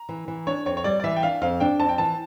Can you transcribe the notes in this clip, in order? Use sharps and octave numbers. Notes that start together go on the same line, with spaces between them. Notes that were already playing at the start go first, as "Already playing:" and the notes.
Already playing: A#5
E3
E3
D4 C#5
F2 C#5
C#5
G3 D5
D5
E3 E5
G5
D4 F5
F2 F5
D4 G5
F2 A5
G5
E3 A5